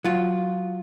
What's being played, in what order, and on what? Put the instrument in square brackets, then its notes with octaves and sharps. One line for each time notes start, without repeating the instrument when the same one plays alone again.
[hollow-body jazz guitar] F#3 F4